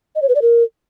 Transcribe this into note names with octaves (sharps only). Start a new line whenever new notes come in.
D#5
C#5
B4
D5
A#4